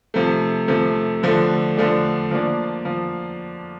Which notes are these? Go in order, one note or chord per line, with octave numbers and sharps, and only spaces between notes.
C3 F3 A3
C3 F3 A3
D3 F3 A3 D4
D3 F3 A3 D4
F3 A#3 D4
F3